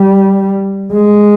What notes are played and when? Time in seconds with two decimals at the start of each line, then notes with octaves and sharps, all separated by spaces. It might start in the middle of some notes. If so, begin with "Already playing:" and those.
Already playing: G3
0.93 G#3